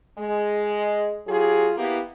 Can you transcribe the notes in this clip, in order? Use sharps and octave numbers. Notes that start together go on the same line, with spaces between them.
G#3
F#3 F4 G4 G#4
A#3 B3 E4 G4